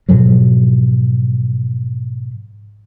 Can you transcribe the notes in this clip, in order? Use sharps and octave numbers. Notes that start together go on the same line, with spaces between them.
G#2 B2 F3 F#3